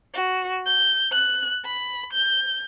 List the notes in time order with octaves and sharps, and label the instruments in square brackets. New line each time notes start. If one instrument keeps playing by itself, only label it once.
[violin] F#4
G6
F#6
B5
G6